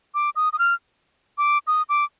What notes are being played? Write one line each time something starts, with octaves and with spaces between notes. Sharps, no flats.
D6
D#6
D#6
F6
D6
D#6
D6